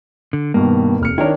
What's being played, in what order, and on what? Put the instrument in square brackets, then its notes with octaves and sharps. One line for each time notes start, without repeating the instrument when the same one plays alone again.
[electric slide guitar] D3
[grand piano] G2 B2 D#3 [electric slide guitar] A#3
[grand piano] F1 F6 C#7
[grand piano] D#3 D4 C#5 [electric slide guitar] E4 A#4